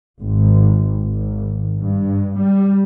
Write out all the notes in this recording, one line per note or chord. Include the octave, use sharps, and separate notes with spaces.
G#1
G#1
G2
G3